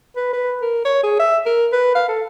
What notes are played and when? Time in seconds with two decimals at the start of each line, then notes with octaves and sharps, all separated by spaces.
0.16 B4
0.33 B4
0.61 A#4
0.85 C#5
1.03 G#4
1.19 E5
1.46 A#4
1.72 B4
1.95 F5
2.08 A4